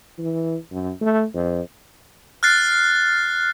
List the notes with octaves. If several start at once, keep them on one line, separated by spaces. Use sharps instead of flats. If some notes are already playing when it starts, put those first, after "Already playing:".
E3
F#2
A3
F2
F6 F#6 A6 C7